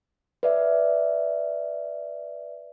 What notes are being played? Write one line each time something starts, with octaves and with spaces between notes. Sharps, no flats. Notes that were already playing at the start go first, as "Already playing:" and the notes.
B4 D5 E5